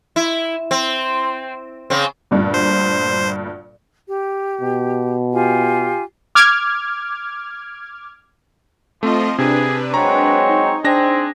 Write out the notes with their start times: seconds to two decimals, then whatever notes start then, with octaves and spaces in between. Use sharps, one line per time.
0.16 E4
0.71 C4
1.90 C#3 C4
2.31 D2 G2 A#2
2.54 C5
4.08 G4
4.61 B2
5.34 F4 G4 G#5
6.35 D6 F6 G#6
9.03 F3 A3 C4 F4 D#5
9.38 C3 D4 G#4 B4
9.94 F#3 G#3 C4 C#5 A#5
10.49 D#4
10.84 C4 D4 G#4 A#6